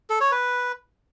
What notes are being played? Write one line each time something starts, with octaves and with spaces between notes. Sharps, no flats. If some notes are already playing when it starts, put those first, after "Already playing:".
A4
C#5
B4